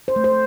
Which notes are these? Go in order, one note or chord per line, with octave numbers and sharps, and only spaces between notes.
C5
A3
C5